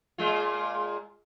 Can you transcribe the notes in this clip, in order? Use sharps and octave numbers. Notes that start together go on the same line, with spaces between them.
A#2 G#3 F4